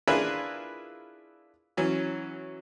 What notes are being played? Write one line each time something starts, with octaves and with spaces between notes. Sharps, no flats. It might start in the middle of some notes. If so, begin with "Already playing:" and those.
D4 E4 F4 G#4 A#4 B4
E3 F#3 C#4